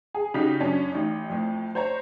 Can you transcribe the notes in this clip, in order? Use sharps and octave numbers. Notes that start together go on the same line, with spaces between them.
G#4
C#3 D#4 F#4 G4 B6
F#2 C#4 D4
A1 D#4
F2 A2
C5 C#5 A#5